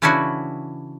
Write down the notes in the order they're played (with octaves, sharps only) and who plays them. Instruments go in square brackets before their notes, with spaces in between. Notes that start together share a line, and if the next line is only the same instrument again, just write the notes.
[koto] C#3 E3 C#4 D4 E4 F#4